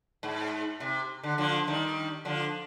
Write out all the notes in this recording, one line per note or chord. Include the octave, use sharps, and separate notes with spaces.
G#2
C3
D3
D3 F3
D#3 G3
D3 F3